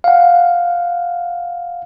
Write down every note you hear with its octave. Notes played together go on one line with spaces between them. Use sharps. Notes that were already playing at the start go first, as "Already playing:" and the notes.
F5 F#5